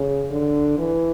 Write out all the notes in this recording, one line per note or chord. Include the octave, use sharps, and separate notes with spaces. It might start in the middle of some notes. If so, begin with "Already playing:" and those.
Already playing: C#3
D3
E3